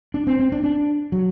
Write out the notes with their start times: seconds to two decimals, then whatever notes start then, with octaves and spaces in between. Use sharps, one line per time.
0.14 D4
0.27 C4
0.40 C4
0.52 D4
0.64 D4
1.12 F#3